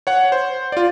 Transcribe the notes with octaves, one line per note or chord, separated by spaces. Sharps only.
C#5 F#5
C5
F4 D5